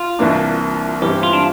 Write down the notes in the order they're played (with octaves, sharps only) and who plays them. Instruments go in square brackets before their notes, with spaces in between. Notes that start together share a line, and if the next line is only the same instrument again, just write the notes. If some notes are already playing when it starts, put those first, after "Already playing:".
Already playing: [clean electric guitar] F4
[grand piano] C2 C3 E3 A#3 D4
[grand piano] G2 E3 G3 C4 E4 [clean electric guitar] G4
[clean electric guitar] F4
D4